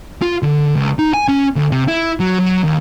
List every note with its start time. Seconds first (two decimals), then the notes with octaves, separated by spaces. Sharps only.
0.22 F4
0.43 D3
0.76 C#2
0.99 D#4
1.14 G#5
1.28 C#4
1.56 D2
1.72 C3
1.88 E4
2.20 F#3
2.40 F#3
2.64 D#2